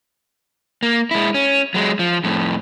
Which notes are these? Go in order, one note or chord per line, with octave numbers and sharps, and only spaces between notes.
A#3
G#3 E4
C#4
F#3 G#3
F3
F2 A2